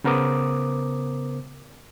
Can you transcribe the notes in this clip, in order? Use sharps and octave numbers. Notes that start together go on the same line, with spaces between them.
C#3 B3 A#4 C5 D6 D#6